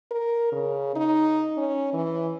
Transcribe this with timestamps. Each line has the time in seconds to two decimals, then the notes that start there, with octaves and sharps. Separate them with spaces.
0.11 A#4
0.52 C#3
0.96 D#4
1.57 C#4
1.93 E3